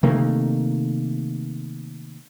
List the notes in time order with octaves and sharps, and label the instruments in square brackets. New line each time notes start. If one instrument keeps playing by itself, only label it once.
[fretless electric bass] C3 D#3 A3 A#3